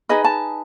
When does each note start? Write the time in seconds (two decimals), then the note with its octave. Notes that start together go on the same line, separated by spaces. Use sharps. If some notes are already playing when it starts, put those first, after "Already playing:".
0.09 D#4 G#4 B4 D#5
0.24 A5